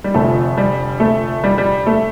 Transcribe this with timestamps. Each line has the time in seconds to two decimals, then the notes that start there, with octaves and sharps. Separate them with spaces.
0.04 G3
0.14 F1 F2 D3 F3 A3
0.57 G3
1.00 A3
1.44 G3
1.58 G3
1.86 A3